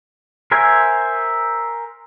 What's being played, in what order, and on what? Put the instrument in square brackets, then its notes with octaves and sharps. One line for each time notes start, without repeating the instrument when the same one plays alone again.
[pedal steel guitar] A#4 C5 E5 G#5